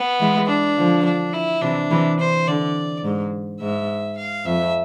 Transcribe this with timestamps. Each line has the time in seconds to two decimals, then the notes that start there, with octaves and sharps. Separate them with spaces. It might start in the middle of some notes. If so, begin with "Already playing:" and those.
Already playing: B3
0.20 E3 G#3
0.48 D4
0.77 D3 F3
1.05 D4
1.33 E4
1.62 C3 E3 D4
1.91 C3 E3
2.19 C5
2.47 D3 D5
3.04 G#2
3.61 G#2 E5
4.17 F5
4.46 F2 E5